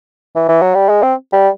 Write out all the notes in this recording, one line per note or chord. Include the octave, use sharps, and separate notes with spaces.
E3
E3
F#3
G3
G#3
C4
G3